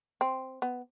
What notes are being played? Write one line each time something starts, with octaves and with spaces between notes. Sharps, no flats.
C4
B3